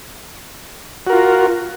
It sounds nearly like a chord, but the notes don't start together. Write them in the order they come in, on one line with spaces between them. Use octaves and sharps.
F#4 A#4 F4